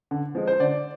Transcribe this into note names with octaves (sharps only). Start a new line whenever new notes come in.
D3
F3 G#3
C5
D3 D5